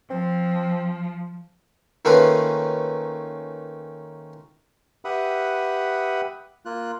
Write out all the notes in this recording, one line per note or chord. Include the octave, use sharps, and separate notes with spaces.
F3 C4
D#3 A3 A#3 C#4 F4 B4
G4 B4 E5 F#5 B5 D#6
A#3 F4 F#6